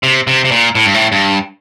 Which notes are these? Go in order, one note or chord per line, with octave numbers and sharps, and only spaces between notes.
C3
C3
C3
A#2
A2
G2
A2
G2